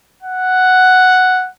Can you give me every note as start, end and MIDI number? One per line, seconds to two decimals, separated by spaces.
0.23 1.48 78